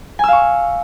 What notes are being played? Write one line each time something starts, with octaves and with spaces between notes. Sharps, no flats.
F5 G#5 C#6 E6